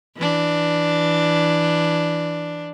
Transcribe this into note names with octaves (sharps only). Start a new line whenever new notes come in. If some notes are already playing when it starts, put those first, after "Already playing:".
E3 D4